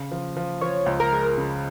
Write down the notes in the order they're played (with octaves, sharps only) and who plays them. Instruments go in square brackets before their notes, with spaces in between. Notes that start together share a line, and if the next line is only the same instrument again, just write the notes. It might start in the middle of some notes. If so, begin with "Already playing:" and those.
Already playing: [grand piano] C#3
F3
F3
[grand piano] F3 [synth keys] C#5
[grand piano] C#2
[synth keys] A#4
[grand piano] G#3
C#3